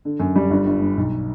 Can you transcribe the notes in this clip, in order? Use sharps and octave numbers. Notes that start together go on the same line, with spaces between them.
D3
F#2
G3
G1
G1
G2
B1